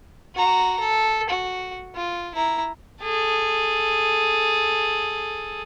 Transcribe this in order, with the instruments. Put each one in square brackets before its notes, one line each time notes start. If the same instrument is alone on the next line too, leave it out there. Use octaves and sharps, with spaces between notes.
[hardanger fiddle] F#4 A#5
A4
F#4
F4
E4 A#5
G#4 A4